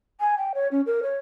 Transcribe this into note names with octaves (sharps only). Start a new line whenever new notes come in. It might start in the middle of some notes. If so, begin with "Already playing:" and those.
G#5
G5
C#5
C#4
A#4
C#5